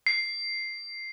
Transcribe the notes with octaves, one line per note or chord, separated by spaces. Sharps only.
C7